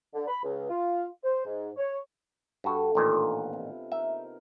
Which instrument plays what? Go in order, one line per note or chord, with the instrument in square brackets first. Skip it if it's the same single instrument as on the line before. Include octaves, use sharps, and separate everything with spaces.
[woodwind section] D3
B5
C#2
F4
C5
G#2
C#5
[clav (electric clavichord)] G2 F#4 [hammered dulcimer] D3 A4
[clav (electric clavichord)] A1 A#2 D#3
[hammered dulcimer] B3 F4 D#5
C3
[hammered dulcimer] D#4 A#4 [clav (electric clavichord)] E5